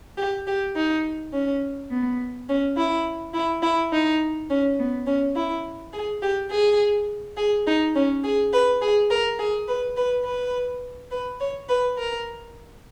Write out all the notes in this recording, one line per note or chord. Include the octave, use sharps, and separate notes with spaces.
G4
G4
D#4
C#4
B3
C#4
E4
E4
E4
D#4
C#4
B3
C#4
E4
G#4
G4
G#4
G#4
D#4
C#4
G#4
B4
G#4
A#4
G#4
B4
B4
B4
B4
C#5
B4
A#4